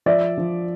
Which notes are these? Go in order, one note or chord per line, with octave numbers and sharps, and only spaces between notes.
F3 D5 E5
F3